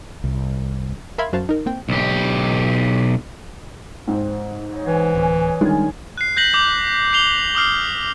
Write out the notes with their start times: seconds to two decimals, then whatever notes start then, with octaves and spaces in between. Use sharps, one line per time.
0.24 C2
1.18 A#4 E5 F5 B5 C6 G#6
1.33 F#2 F#4 C5 F5 A5
1.49 D#4 A#4
1.66 A#3 C4 G5
1.89 B1 G4
4.07 G#2 C4
4.72 F#3 D#4
4.86 E3 C4 G#4
5.15 D1 F#2 C#4
5.61 D#3 G3 G#3 D4 F4 F5 G#5
6.17 F#6 C7
6.36 F#6 G6 A#6 B6 F#7
6.53 D6 G6
7.13 C7 F7 G7
7.55 D6 D#6 F6 C7